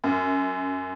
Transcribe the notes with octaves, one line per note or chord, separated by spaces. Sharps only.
F#2